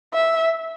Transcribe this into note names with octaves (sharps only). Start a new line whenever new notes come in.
E5